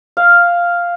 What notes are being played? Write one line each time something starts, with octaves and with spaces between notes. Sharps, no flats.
F5